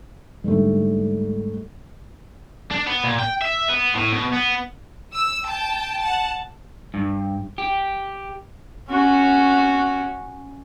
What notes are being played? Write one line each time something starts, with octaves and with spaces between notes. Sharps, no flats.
G#2 D3 G3 A3
D4
B3
A#2
G5
E5
B3
A2
B2
B3
E6
G5 A5
F#5 A5
G2
G4
C#4 F#4